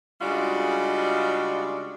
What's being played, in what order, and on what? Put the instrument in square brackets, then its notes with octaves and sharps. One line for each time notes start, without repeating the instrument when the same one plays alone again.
[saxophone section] C#3 G3 G#3 D4 F4 F#4